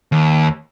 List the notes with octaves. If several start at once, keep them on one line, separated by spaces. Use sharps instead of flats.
D#2